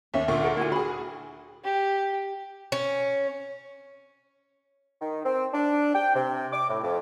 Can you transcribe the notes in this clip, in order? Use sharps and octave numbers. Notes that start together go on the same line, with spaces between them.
D#2 C#4 E5
D2 A#2 C#6
A4 A#4 F#5
E4 F#4 G#5
F#4 G#4 B5
G4
C#4
D#3
C4
D4
G5
C3
D6
A2
F2